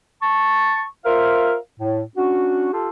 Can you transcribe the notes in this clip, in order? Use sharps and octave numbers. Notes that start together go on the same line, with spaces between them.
A5 C#6
F4 A#4 C5 E5 F5
A2
C#4 D4 F#4
F4 G4 A4